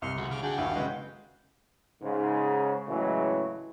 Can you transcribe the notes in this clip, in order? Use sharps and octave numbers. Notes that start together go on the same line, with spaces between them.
C2 C6 C#6 F6
C#2 F#4
C#3 D6 F6
D4 F#4 G#4 G5
A#1 D#2 E4 F5
C#3 G#3 B4
G#2 C#3
A2 C#3 E3 F#3 G#3